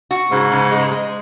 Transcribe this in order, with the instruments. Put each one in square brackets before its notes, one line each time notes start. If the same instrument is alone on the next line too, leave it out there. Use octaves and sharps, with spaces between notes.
[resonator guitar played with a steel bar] F#4
[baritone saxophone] G#2 [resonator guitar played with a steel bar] C#3
[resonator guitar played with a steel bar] C#3
G#3
G#3